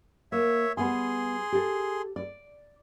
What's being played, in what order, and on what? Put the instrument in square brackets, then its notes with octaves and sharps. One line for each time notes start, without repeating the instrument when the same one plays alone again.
[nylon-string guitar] A#3 [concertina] C#5 E5
[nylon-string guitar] G3 B3 G#5 [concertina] G#4 C6
[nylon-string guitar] G4 A4
D5